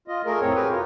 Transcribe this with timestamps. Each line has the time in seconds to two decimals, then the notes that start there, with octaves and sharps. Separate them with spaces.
0.08 F4 D#5
0.26 A3 G#4 A#4
0.41 F2 A2 C4 C#5
0.55 G4 G#4 A#4 B4
0.70 B2 F4